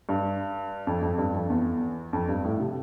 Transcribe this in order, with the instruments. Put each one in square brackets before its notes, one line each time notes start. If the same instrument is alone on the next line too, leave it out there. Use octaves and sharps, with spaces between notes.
[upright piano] G2
F2
F2
G2
F2
E2
F2
G2
A2
C3